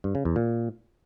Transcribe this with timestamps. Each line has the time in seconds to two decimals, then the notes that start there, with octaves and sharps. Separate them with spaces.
0.04 G2
0.15 C#3
0.25 E2
0.36 A#2